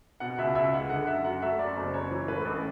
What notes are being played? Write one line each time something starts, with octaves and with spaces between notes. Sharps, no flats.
B2 F#5
C#2 E5
C#2 E5
G#3 F#5
D3 F#5
F#2 E5
F#2 F#5
A3 E5
F#2 D5
F#1
F#1 C#5
E3
A2 B4
A1